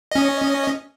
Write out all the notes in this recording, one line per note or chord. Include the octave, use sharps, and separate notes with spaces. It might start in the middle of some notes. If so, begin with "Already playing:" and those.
C#4 D#5